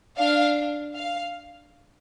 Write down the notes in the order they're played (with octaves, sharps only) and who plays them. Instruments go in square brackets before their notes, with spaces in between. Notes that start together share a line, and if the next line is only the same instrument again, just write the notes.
[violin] D4 [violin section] F5
[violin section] F5